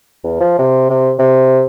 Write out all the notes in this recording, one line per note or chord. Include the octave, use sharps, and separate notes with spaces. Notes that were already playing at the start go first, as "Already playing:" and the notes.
E2
F3
C3
C3
C3